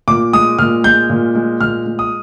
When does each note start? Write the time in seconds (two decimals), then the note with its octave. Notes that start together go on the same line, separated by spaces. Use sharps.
0.08 A#2 D6
0.33 G#3 D#6
0.59 A#2 F6
0.84 G#3 G6
1.10 A#2
1.35 G#3
1.61 A#2 F6
1.86 G#3
1.99 D#6